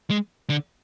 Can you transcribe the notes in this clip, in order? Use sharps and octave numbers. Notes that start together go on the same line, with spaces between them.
G#3
D3